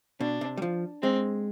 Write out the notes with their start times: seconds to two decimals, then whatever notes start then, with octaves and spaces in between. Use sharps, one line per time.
0.20 B2 D4
0.41 C3
0.57 G3
0.62 F3
1.03 G#3 C4